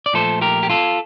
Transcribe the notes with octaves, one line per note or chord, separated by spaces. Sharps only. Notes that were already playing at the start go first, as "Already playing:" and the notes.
D5
A#2 F3 A3 A4 C5
G4 A#4
G4
F4 A4